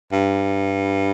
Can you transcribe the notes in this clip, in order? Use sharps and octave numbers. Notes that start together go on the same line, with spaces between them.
G2